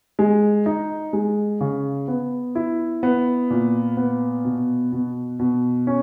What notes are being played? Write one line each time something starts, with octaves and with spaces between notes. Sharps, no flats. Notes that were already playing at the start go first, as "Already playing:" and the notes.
G#3
D#4
G#3
C#3
B3
E4
B3
A#2
B3
B2
B2
B2
C#4